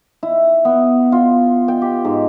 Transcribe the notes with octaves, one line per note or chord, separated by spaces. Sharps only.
E4
B3
F4
G5
G4
G#2